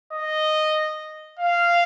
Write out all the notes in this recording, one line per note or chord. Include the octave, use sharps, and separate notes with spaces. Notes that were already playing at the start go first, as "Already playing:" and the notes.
D#5
F5